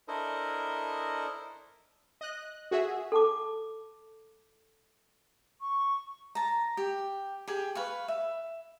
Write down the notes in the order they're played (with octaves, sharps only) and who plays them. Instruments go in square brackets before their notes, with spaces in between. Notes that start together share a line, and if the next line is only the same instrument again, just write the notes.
[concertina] D4 E4 A4 A#4 C5 D#5
[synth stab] D#5 F#6
F#4 G#4 E5
[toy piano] A4 A5 D6
[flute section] C#6
[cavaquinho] A5 A#5
G4
G4 G#4
B4 F5 C#6
E5